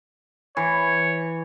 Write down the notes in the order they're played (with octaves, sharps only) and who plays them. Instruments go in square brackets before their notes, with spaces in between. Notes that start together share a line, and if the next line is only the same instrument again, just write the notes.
[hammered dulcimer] E3 [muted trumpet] C#5